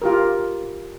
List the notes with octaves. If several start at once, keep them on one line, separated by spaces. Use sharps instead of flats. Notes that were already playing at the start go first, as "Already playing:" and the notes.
F4 G4 A#4